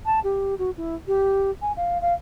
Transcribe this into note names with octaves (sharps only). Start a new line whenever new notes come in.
A5
G4
F#4
E4
G4
G#5
F5
F5